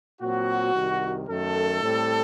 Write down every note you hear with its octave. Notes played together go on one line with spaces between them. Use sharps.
A#2 F#3 C4 F#4
C2 C3 D#3
F#2 D#3 A3 A4
A2 G3 C4